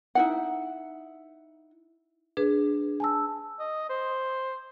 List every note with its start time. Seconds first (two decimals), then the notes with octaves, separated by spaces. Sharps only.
0.15 D#4 E4 F#5
2.37 D4 G#4 B4
3.00 G#5 A5 E6
3.59 D#5
3.89 C5